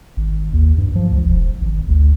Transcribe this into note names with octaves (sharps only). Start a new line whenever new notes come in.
G#1
D#2
G2
F3
C#2
E1
G#1
D2